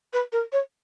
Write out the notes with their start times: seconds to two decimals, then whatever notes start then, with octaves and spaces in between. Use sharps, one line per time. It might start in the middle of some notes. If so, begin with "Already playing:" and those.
0.13 B4
0.32 A#4
0.52 C#5